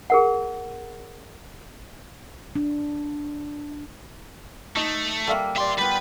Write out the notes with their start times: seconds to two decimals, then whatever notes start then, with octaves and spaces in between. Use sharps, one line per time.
0.10 G#4 A#4 F#5
2.55 D4
4.76 A3 D#4
5.27 G3 A#3 A4 E5 F5
5.57 G4 D5 E5 C6
5.79 G3 B3 F4 B4